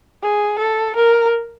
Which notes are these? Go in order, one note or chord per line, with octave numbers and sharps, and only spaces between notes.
G#4
A4
A#4